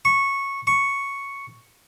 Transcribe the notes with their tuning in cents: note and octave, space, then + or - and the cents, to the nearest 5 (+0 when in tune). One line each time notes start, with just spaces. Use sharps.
C#6 -10
C#6 +0